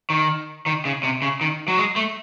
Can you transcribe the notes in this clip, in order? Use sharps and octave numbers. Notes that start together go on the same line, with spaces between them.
D#3
D#3
C#3
C3
C#3
D#3
F#3
G#3
A3